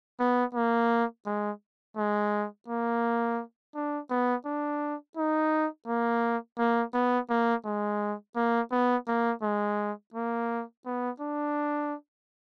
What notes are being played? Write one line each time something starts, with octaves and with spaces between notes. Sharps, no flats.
B3
A#3
G#3
G#3
A#3
D4
B3
D4
D#4
A#3
A#3
B3
A#3
G#3
A#3
B3
A#3
G#3
A#3
B3
D4